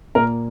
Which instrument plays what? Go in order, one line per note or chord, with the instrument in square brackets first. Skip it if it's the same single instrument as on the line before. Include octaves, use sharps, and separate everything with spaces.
[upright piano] A#2 A#3 A#4